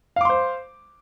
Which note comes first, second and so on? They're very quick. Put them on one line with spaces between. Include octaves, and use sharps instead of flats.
F5 D6 C6 C5